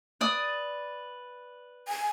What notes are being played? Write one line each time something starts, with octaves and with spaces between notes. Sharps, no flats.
B4 D5 D#6
G#5